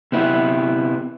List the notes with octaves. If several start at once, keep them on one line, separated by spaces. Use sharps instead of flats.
C3 B3 E4